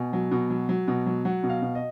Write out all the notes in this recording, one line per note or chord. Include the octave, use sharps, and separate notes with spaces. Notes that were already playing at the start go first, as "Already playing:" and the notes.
Already playing: B2 G#5
F#3
B2
F#3
F#3
B2
F#3
F#3 F#5
B2
F5
B2
D#5